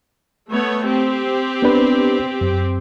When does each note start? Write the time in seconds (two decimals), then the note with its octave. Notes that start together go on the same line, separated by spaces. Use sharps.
0.51 A3 B3 C#5
0.85 C4 G4
1.62 B3 D4 B4
2.41 F#2